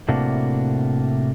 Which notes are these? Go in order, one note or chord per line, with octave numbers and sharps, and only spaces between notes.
A2 C3 A#3 D4 F#4